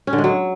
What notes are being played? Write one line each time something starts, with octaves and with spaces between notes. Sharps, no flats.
C#4
D3
G#3
F#3